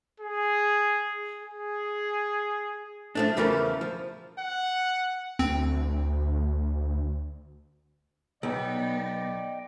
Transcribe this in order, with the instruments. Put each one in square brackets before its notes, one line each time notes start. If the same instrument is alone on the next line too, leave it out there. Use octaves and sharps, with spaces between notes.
[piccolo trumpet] G#4
G#4
[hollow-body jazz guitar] F3 A3 D4
E2 C#3 E3 F3 A3 A#4
F3
[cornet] F#5
[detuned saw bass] D2 [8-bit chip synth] C4
[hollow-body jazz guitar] B1 [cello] B3 D#4 [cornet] D5 [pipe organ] D#5 G5